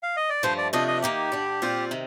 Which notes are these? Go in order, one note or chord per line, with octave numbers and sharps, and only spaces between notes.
F5
D#5
D5
G2 F3 A3 C5
D5
C3 F3 A3 D4 D#5
D#5
D#3 A#3 D#4 G4
G2 D3 G3 D4
A#2 G3 C4 F4
C3 D#3